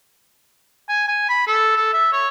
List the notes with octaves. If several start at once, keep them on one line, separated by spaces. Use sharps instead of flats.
G#5
G#5
B5
A4
A4
E5
C#5